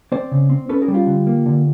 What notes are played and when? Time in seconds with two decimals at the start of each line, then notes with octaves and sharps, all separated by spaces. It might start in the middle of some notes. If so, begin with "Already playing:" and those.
0.12 C4 C5 D5
0.32 C#3
0.50 C4
0.69 C#4 A4 B4
0.82 G#4 A#4
0.88 G3
0.94 F4 G4
1.07 D3
1.27 A#3
1.46 D3